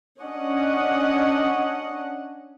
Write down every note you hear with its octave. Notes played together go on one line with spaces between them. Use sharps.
C#4 D4 D#5 F#5